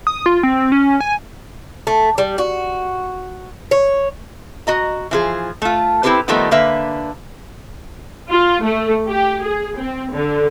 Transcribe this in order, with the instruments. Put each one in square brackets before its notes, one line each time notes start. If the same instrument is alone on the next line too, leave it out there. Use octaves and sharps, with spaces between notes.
[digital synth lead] D#6
F4
C4
C#4
G#5
[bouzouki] A3
G3
F#4
C#5
[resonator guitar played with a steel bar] F#4 D#5 A#5
E3 F3 G#4
A3 F4
C4 E4 F#4 G4 B4 C5
D#3 F3 G3 A3 B3 D#4
D3 A#3 B4 E5
[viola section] F4
A3
G4
G#4
C4
D3